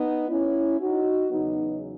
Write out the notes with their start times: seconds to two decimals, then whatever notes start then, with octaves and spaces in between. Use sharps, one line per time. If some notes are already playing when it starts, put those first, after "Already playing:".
Already playing: B3 D#4
0.29 C#4 E4
0.80 D#4 F#4
1.31 E2 C#3 F#3 B3 D#4